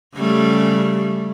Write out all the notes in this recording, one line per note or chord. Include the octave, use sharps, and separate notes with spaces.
C#3 G3 A3